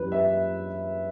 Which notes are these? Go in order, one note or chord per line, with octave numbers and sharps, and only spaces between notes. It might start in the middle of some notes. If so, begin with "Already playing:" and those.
Already playing: F#2 E3 G3 B4
E5